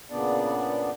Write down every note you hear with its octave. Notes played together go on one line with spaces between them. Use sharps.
A#2 C#3 B3 D4 D5